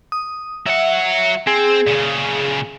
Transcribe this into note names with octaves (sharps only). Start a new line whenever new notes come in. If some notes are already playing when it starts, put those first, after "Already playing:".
D#6
F#3 E5 F#5
C4 G#4
A#2 C#3